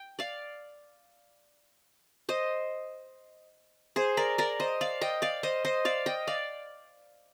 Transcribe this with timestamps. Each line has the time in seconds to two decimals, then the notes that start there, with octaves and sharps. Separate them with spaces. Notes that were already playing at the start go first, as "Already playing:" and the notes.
Already playing: G5
0.19 D5 F5
2.29 C5 D#5
3.96 G#4 C5
4.17 A#4 D5
4.38 A#4 D5
4.60 C5 D#5
4.81 D5 F5
5.01 D#5 G5
5.22 D5 F5
5.43 C5 D#5
5.65 C5 D#5
5.85 D5 F5
6.06 D#5 G5
6.27 D5 F5